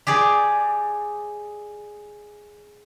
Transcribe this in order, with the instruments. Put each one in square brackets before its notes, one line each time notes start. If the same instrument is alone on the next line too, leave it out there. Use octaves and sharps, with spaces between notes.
[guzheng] G4 G#4 D5